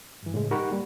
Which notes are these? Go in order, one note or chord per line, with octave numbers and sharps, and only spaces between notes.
G2 E3
A2 C#3 G#3 A3
D#4 G4 A#4 F#5 B5 C#6
G3 A#3